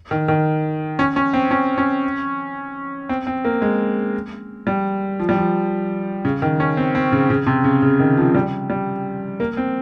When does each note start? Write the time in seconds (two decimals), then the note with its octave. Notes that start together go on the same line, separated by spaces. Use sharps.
0.11 D#3
0.28 D#3
0.99 C#4
1.16 C#4
1.34 C4
1.51 C#4
1.78 C#4
3.09 C4
3.27 C4
3.45 A#3
3.62 G#3
4.67 G3
5.20 F3
5.29 G3
5.37 F3
6.25 C#3
6.42 D#3
6.60 C#4
6.77 C4
6.95 C4
7.12 C#3
7.30 C#3
7.47 C3
7.64 C#3
7.82 C#3
8.00 D#3
8.17 F3
8.35 G3
8.70 G3
9.40 A#3
9.57 C4